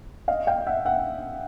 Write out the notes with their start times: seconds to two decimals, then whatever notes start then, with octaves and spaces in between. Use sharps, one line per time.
0.28 D#5 F5
0.47 F5 G5
0.67 E5 F#5
0.85 E5 F#5